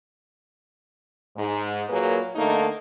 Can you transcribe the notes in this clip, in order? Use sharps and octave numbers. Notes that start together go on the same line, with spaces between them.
G#2
A#2 F#3 A#3 G#4 B4
D3 A3 A#3 D#4